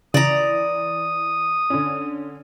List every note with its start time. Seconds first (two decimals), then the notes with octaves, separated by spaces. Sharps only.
0.14 C#3 E3 D5 A#5 D#6
1.70 D3 C#4